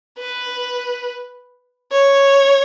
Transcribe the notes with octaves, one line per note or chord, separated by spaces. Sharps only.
B4
C#5